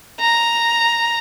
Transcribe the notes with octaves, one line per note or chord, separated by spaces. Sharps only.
A#5